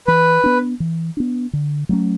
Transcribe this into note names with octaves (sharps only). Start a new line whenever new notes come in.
E3 B4
B3 D4
E3
B3 D4
D3
F#3 A3 C#4